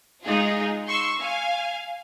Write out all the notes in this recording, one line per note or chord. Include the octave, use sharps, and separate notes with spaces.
G#3 D#4 F4 G#4
C6 C#6 E6
F5 G#5